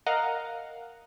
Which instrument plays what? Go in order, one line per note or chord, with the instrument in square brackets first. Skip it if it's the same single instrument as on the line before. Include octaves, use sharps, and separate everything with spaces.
[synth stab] A#4 D#5 F5 F#5 A#5